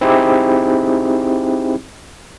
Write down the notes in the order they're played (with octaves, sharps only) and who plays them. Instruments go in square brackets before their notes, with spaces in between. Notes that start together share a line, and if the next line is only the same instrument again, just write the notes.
[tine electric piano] C4 D#4 E4 G4 G#4